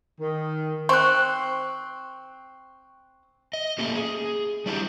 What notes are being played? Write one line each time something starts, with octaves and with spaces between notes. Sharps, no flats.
D#3
C4 C#6 F#6
D#5
A3 A#3 C#4 G4
G#4
G3 D4 E4 F4 G4